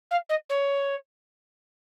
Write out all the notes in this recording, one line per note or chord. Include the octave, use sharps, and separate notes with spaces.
F5
D#5
C#5